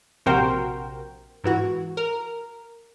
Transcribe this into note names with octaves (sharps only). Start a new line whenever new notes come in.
A#1 C3 F#4 A#4 C5 G5
G#2 E3 F#4
A#4